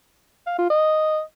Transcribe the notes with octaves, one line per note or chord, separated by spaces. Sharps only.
F5
F4
D#5